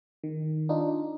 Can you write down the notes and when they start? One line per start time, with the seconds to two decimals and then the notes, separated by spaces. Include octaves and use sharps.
0.24 D#3
0.69 D4 D#4 F4